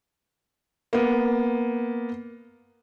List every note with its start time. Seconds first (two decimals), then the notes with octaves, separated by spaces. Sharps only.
0.93 A#3 B3